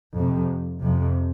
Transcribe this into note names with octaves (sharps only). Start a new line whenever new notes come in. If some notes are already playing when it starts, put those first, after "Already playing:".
F2 C3
F2 C3